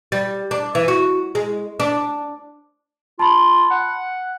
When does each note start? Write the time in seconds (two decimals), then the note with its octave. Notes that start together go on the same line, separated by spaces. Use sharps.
0.12 G3
0.51 D4
0.75 E3
0.88 F#4
1.35 G#3
1.80 D4
3.19 F4 A5 B5 C6
3.71 F#5